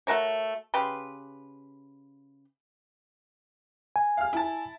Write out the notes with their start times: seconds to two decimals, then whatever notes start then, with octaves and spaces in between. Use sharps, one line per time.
0.07 A3 F#4 A#4 C#5
0.74 C#3 G4 B4 C6
3.96 G#5
4.17 F5 F6
4.33 E4 A5